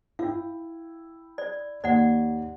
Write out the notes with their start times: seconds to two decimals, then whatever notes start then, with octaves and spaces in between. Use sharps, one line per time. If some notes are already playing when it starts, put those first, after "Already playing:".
0.19 E4 F5 G5
1.38 D5
1.84 D#2 D5 F#5